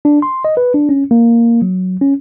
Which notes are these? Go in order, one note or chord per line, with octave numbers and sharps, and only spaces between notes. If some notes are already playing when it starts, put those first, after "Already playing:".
D4
C6
D#5
B4
D4
C#4
A#3
F#3
C#4